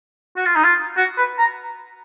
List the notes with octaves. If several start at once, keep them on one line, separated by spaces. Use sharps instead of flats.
F#4
F4
D#4
F4
F#4
B4
A#5